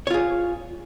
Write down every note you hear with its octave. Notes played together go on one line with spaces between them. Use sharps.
F4 G#4 C#5